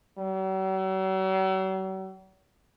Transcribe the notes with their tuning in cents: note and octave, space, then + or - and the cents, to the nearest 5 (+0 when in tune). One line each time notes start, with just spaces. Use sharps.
F#3 +45